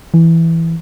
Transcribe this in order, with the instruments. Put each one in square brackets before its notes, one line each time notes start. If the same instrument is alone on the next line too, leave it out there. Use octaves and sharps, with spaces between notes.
[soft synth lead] E3